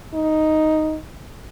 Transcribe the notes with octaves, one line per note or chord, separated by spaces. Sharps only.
D#4